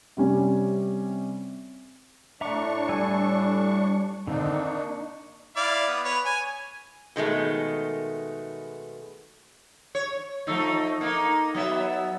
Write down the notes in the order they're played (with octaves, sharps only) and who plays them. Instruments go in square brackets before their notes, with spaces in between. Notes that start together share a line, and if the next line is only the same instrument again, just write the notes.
[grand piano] C3 G3 C#4
[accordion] A2 D4 C#6 [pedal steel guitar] E5 A#5 D6
[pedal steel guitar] G3 G#5 E6
[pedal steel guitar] D3 D#3 C4 [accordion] A#3 D4 D#4
[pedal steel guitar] C#6
[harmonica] E4 D5 F5
B3
B4 C#5
G#5
[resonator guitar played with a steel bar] B2 D#3 G#3 A3
[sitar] C#5
F3 A3 D#4
A#3 D#4
F#3 B3 E5